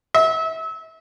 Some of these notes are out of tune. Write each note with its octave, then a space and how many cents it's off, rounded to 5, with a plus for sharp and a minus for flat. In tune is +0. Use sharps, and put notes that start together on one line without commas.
E5 -30